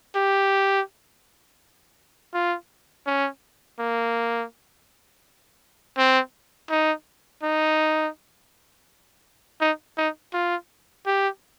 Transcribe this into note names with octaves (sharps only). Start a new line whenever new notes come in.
G4
F4
C#4
A#3
C4
D#4
D#4
D#4
D#4
F4
G4